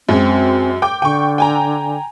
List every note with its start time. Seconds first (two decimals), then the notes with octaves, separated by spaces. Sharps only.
0.09 F#2 F#3 G#3 C4
0.82 G5 D6 G6
1.02 D3 G5 C#6
1.38 G5 G#5 A#5